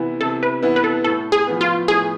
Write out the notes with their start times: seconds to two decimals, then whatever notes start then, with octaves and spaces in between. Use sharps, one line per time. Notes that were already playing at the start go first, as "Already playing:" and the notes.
Already playing: C3 E3 B3 E4
0.21 C3 A4
0.43 B4
0.62 E3 B3 E4
0.76 B4
0.84 A4
1.04 A2 A4
1.32 G#4
1.47 F3 B3
1.61 F4
1.88 A2 G#4